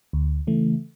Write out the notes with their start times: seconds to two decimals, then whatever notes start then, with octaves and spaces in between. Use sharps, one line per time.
0.13 D2
0.47 C#3 E3 A3